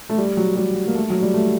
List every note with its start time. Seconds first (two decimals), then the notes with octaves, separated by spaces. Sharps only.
0.09 A3
0.18 G3
0.37 F#3
0.57 G3
0.87 A#3
0.95 A3
1.10 F#3
1.22 G3
1.34 A3